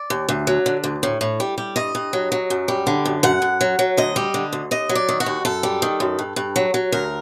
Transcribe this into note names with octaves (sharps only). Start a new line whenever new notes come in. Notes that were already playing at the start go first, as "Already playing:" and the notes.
Already playing: D5
D#2
D2
F#3
D3
D2
A2
A2
G3
G3
G2 D#5
G2
F#3
F#3
F#2
G3
D3
F#2
F#2 F#5
F#2
F#3
F#3
D2 D#5
G3
D3
D2
D#2 D#5
F#3
D5
D#3
F#4
D#2
F#2 A4
G3
D#3
F#2
G2
G2
F#3
F#3
D2 A#4